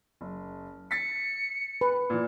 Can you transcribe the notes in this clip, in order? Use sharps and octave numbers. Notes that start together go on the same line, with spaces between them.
F#1
A6 B6 C#7
B4
A#2 E3